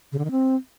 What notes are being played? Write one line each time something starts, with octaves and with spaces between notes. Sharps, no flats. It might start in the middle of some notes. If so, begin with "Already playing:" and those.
C#3
D3
D#3
C4